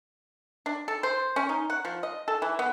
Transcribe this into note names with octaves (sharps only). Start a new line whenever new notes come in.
D4
A4
C5
C#4
D#4
F#5
F3
D#5
A4
E3
B3